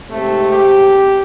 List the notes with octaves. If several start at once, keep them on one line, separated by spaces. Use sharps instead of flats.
G#2 C3 A3
G4